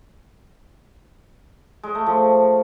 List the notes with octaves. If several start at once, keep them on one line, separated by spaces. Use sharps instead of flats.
G#3
A3
F3